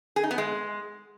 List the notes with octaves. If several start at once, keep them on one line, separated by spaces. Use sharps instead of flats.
G#4
D#4
B3
G#3